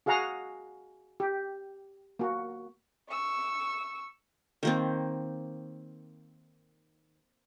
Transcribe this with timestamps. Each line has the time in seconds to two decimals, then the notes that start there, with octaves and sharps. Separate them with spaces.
0.06 F#4 G#4 F5 F#5 A#5
1.20 G4
2.19 A#3 F#4
3.10 C#6 E6
4.63 D#3 A#3 C4